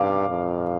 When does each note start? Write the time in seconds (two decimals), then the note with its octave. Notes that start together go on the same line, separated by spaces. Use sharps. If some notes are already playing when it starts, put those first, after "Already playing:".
Already playing: G2 F5 D6
0.29 F2